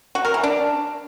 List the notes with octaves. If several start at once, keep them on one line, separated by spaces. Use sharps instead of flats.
F#4
A#4
E3
D4